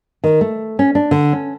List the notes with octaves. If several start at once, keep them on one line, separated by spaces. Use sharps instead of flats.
D#3
A3
C#4
D4
D3
C#4